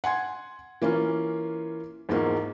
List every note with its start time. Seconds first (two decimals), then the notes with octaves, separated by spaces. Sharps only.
0.04 F#5 G#5 C6 G#6
0.82 E3 A#3 C#4 F4
2.09 E2 G#2 F3 G#3 A#3